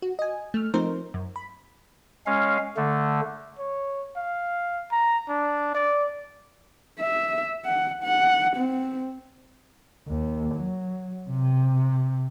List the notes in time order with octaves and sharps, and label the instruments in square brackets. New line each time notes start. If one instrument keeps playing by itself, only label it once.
[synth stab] F#4
D#5 G#5
A3 F6
F3 A3 C4 D#4 A#4 C5
F#2
B5
[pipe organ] G#3 C#4 F5
D3 A3
[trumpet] C#5
F5
A#5
D4
D5
[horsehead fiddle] E5
F#5
F#5
C4
[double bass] D#2
F#3
C3